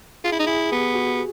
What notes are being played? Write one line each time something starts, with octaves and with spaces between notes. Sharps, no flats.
F4 G#4
E4
D#4
E4 G#4
B3 G4
F#4